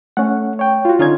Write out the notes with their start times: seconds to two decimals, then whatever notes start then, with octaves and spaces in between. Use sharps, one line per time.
0.17 A3 C#4 F#5
0.59 C#5 G5
0.85 F4 F#4
0.99 D3 C#4 D#4 F4 G#6